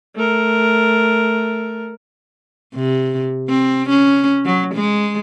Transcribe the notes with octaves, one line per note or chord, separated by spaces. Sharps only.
A3 A#4
C3
C4
C#4
F#3
G#3